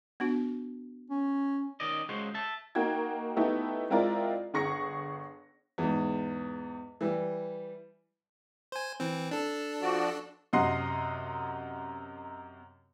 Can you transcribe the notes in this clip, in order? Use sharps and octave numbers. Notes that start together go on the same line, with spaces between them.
B3 D4 F#4
C#4
D#3 C#4 D5 D#5
C#3 G#3 F#4 C5
E5 A5
A#3 D#4 F#4 G5 G#6
A3 B3 D#4 E4 G4
G#3 C4 E4 F4 A#4 D5
G1 G#4 C#6 A#6 C#7
E2 G#2
E3 G3
C5 G#5
E3 C4
D4 A4
F3 F#4 D5
F#2 C3 D#5 F#5 C6 C7